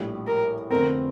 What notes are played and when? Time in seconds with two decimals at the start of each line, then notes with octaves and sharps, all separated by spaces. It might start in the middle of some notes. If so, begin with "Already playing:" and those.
Already playing: A#1 A2 G3
0.27 A#4
0.71 F1 F2 D3 A3 C4 A#4